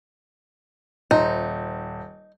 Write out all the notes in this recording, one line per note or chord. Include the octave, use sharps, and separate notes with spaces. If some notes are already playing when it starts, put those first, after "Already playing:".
D#1 D#4 C5